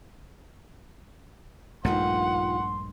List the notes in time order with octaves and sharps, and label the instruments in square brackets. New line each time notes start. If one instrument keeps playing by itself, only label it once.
[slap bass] A#1 G2 A3 [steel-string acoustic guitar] D#3 F4 G4 [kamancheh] F#5 [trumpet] C6